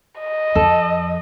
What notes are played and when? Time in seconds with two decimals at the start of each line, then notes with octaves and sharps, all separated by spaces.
0.20 D#5
0.55 F2 A4